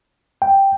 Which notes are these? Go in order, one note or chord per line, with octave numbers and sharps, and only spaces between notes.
G5